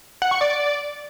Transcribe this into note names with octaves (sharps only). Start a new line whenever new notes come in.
F#5
C#6
D5